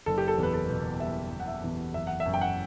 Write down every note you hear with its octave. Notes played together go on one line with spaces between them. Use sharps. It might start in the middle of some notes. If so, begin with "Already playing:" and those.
F#1 A4
G4
A4
E2
B4
A4
B2
G3 E5
F#1
F#5
E5
E2
F#1 E5
F#5
E5
F#2
G5
F#5